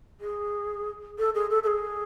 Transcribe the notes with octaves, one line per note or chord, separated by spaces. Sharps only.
G#4
A4
G#4
A4
A4
G#4